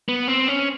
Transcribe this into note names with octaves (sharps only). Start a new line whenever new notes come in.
B3
C4
C#4